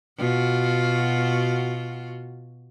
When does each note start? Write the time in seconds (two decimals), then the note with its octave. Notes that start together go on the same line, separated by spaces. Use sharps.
0.18 B2 F4 F#4